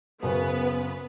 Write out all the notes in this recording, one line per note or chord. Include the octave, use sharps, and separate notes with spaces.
F#2 C#3 B3 B4 C5